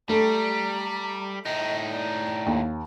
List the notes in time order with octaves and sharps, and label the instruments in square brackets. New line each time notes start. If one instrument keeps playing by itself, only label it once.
[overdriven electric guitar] G3 [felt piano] A3 [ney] A#5
[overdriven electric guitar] A2 D#4 [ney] D#5
[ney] D5
[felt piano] D#2